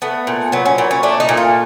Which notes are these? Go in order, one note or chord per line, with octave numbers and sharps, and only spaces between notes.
A3 B3
A#2
F#3 B3
C#4
A#2 B3
C#4
A3 D4
D#4
A#2
F4